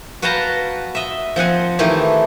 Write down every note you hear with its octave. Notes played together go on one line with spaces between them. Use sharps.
F#4 B4 F5 G5 A5 A#5
D#5 E5
F3 C4 F#5 G#5
D#3 E3 A3 E4 G4